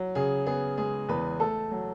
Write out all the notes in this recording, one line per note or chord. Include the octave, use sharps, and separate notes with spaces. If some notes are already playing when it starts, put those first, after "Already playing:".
Already playing: F#3
C#3 G#4
B3 G#4
G#3 G#4
E2 B4
A3 A4
F#3